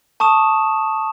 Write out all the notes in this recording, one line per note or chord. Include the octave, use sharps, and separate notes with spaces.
A5 C#6 D#6 E7